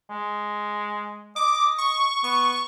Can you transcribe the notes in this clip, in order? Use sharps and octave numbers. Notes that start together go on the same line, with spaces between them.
G#3
D#5 D6
C#6
B3 C#6